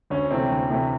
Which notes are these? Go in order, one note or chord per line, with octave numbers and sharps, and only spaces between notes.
D2 C#4
C3 E3 A3 C4
D2
C3 E3 A3